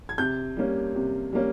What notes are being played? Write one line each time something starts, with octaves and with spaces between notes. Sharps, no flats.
G#6
C3 G6
G3 A#3 C#4
C3
G3 A#3 C#4